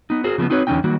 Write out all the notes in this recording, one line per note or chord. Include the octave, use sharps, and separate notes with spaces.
B3 D#4
F#4 G#4 A#4 C5
C#3 F3 F#3 B3
C4 D#4 F#4 B4 C#5
E2 D3 G#3 C#4 D#4 G5
D#3 F#3 G3 A#3 F#4